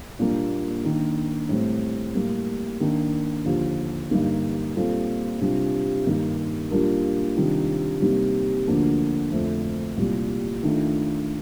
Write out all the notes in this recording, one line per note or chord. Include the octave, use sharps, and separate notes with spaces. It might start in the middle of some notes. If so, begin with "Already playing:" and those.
A#2 G3 A#3 D4
D#3 A#3 D4
A2 G3 C4
A2 G3 A#3
D#3 A#3 D4
D#2 D3 F3
G2 D3 G3 A#3 D#4
A#2 G3 C4 F4 A4
C3 G3 D4 F4
G2 D#3 A#3 D#4 G4
A#2 G3 D4 F4 A#4
C3 D#3 G3 D4 F4
C3 G3 A#3 D#4
D2 D3 F3 A#3 D4
F2 D3 A3 C4
C2 A#2 G3
D#3 A3 D4 F4